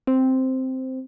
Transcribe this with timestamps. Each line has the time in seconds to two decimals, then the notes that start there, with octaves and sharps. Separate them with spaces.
0.07 C4